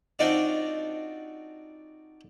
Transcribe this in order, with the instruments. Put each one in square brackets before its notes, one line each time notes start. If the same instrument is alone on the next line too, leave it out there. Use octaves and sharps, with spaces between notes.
[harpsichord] C4 D4 D#4 F4 F#4 D5